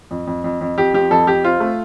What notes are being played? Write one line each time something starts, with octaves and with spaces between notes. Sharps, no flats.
F2
F2
F2
F2
F2 G4
F3 G4
F2 A4
F2 G4
C4 F4
A3